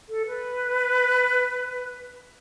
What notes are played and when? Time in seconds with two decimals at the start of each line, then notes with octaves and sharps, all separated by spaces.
0.09 A4
0.27 B4